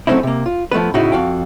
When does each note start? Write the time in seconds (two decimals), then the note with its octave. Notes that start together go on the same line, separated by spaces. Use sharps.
0.07 F#3 A3 C4 C#4 D#4 E4
0.23 C3 A#3
0.46 F4
0.72 F3 A3 B3 B4
0.94 A2 C#3 D#4 E4 F#4
1.12 F2 F#4 F5 G5